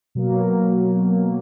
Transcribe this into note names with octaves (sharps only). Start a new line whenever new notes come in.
B2 F#3 A#3